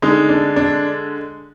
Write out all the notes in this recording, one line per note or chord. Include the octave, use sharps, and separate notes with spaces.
D3 G#3 D#4
D4
D4